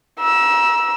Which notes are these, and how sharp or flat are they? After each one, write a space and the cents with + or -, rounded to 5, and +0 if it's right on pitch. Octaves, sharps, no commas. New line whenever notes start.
A#5 +35 E6 +0